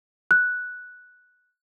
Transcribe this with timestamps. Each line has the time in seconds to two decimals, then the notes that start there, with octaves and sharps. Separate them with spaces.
0.31 F#6